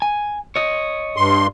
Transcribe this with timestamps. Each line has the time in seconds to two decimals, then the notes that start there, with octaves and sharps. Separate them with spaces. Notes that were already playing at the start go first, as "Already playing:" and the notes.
0.02 G#5
0.56 C#5 D#5
1.16 G2 C6